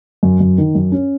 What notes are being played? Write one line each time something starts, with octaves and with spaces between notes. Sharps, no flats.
F#2
F#2
D#3
F#2
C#4